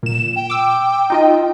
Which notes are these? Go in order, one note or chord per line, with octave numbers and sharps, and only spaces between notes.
A#2 E7
G5
D6 E6
D#4 F4 D#5